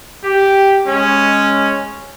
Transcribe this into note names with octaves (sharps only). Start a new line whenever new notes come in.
G4
G#3 C#4